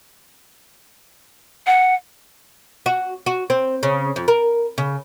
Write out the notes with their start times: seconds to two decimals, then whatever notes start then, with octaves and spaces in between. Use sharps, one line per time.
1.67 F#5
2.86 F#4
3.26 F#4
3.50 C4
3.83 C#3
4.16 F2
4.28 A#4
4.78 C#3